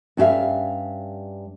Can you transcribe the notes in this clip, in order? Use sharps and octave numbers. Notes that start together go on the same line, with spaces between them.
G2 C#4 F#4 G4 E5 F5